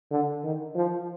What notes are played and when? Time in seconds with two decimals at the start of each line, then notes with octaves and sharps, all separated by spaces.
0.11 D3
0.44 D#3
0.75 F3